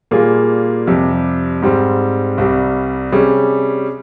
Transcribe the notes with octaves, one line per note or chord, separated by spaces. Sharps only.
A#2 G3 A#3 F4 G#4
F2 C3 G3
G#2 G3 C4
C2 C3 G3
C3 G3 C#4 G#4